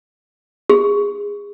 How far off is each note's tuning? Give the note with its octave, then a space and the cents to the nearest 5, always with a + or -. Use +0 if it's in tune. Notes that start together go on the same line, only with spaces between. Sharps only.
G#4 -25